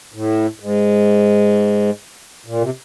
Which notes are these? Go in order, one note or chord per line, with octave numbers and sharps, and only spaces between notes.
A2
G#2
A#2
C3